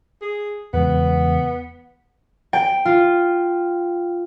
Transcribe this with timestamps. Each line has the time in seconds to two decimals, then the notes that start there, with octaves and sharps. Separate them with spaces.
0.22 G#4
0.73 E2 C#3 G#3 B3
2.53 G5
2.85 F4